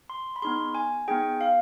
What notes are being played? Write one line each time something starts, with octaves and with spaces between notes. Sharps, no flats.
C6
B5
B3 D#4 G#4 C6
G#5
B3 D#4 G#4 G5
F5